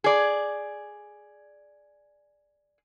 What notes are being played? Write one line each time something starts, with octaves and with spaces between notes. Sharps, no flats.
G#4 D5